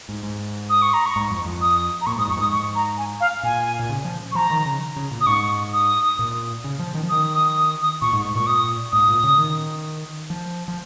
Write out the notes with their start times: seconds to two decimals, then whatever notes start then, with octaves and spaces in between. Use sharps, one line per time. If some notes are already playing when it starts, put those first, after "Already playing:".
0.09 G#2
0.23 G#2
0.70 D#6
0.82 C#6
0.94 A#5
1.06 C#6
1.16 G#2
1.31 F2
1.45 F2
1.61 D#6
2.01 A#5
2.07 A#2 C#6
2.17 G#2 D#6
2.27 F2 C#6
2.37 G#2 D#6
2.52 C#6
2.75 A#5
2.98 G#5
3.20 F5
3.43 A#2 G#5
3.79 A#2
3.89 C#3
4.04 F3
4.32 C#6
4.35 F3 A#5
4.51 D#3
4.66 C#3
4.97 C#3
5.11 A#2
5.21 D#6
5.27 G#2 C#6
5.73 D#6
6.19 A#2
6.64 C#3
6.79 F3
6.95 D#3
7.03 F3
7.09 D#3 D#6
7.34 D#6
7.57 D#6
7.81 D#6
8.02 A#2 C#6
8.13 G#2
8.25 G#2
8.35 A#2 C#6
8.47 D#6
8.92 G#2 D#6
9.08 A#2
9.23 C#3
9.38 D#3
10.30 F3
10.68 F3